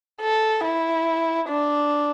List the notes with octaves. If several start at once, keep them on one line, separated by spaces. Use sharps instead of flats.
A4
E4
D4